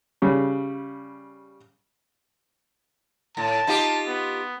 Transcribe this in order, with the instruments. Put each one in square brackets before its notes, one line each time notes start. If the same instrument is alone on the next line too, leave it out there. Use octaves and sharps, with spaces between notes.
[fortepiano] C#3 G3
[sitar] A2 [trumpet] A5
[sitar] D#4 F4 G4
[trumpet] B3